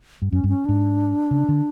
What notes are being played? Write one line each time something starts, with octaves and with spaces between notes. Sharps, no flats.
G2
F#2 C#4
G2
C#4
G#2 D4
C#3
D3